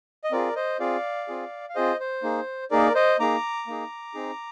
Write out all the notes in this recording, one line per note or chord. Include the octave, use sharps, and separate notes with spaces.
D#5
C4 F4 G#4 A#4 D5
C5 D#5
C4 F4 G#4 D5 F5
C4 F4 G#4
F5
C4 F4 G#4 C5 D#5
C5
A#3 D#4 G#4
A#3 D#4 G#4 A#4 D5
C5 D#5
A#3 D#4 G#4 A#5 D6
A#3 D#4 G#4
C4 D#4 G#4